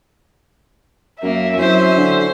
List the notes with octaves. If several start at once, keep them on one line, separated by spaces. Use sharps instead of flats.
F#2 A#3 E5
F#3 C4 C#4 E4 C5
D3